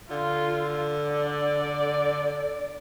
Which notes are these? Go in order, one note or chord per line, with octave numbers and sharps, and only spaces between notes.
D3 F4
D5